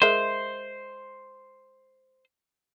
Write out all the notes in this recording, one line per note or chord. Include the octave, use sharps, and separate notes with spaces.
G#3 A#4 C5 E5